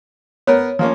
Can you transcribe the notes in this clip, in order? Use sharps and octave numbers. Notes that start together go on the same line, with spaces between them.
B3 A#4 C#5
F3 A#3 C#4